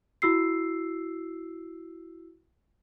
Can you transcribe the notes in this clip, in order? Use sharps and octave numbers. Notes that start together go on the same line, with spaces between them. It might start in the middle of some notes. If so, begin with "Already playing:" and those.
E4 F#4 E6 C7